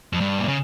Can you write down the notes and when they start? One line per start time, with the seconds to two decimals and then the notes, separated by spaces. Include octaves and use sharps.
0.13 F2
0.20 G2
0.39 A#2
0.48 C#3